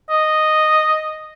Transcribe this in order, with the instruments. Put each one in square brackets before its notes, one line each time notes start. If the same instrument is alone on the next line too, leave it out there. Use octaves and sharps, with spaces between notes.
[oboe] D#5